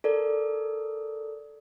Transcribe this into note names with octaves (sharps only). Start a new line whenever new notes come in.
A4 A#4 D5